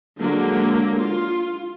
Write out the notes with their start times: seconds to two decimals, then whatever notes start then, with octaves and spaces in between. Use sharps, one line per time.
0.20 D3 F#3 G#3 A#3
1.00 F4